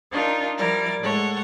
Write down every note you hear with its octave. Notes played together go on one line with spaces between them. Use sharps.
D4 D#4 F4 A#4
F3 G3 E4 A#4 D5
A2 G#3 A4 C#5 F#5